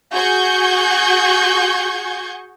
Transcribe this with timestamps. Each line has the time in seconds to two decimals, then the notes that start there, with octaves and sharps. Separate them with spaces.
0.13 F#4 G#4 C#6 G6 G#6